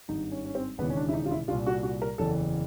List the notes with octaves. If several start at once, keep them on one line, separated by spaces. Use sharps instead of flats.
G#1 G2 D#3 D#4
C#4
C#4
C4
E1 D#2 C#3 E3 B3
C#4
D4
E4
D#4
F4
E4
C2 A#2 F4
F#4
F#4
A#4
F#1 E2 C#3 E3 A4